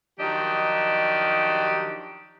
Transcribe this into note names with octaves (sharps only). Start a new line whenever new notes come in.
D#3 F3 F#3 D4 G4 D#5